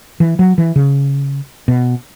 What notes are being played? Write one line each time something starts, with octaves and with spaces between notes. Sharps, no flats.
E3
F#3
E3
C#3
B2